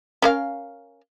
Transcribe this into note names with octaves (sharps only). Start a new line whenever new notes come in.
C#4 A#4 F5